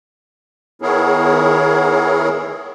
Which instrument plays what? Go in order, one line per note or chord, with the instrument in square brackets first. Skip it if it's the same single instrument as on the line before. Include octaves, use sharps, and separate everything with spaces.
[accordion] D#3 B3 E4 G#4 A#4 C#5